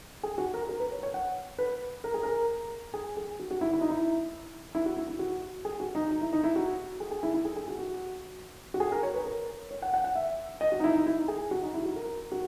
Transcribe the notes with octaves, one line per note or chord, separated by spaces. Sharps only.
G#4
F#4
A#4
A#4
B4
C#5
C#5
F#5
B4
A#4
G#4
A#4
G#4
G#4
F#4
F#4
E4
E4
D#4
E4
E4
F#4
E4
E4
F#4
G#4
F#4
D#4
D#4
E4
D#4
E4
F#4
G#4
G#4
E4
E4
G#4
G#4
F#4
F#4
F#4
G#4
A#4
C#5
B4
A#4
C#5
F#5
F#5
F#5
E5
D#5
F#4
D#4
E4
D#4
E4
G#4
F#4
D#4
E4
F#4
A#4
F#4